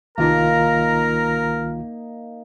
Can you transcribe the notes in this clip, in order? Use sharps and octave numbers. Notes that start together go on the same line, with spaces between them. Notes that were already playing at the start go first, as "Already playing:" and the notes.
C2 D#3 A#3 D#4 F4 A#4 A#5